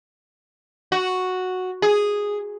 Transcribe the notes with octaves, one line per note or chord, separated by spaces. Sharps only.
F#4
G#4